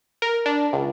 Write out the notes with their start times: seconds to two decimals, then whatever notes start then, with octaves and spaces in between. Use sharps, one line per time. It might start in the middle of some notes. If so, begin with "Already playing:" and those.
0.22 A#4
0.46 D4
0.73 C#2